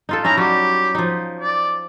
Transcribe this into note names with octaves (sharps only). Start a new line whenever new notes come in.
D#4 F4 A4
C#4 D#4 E4 A#5
F#3 G3 G4
F3 D#4
D5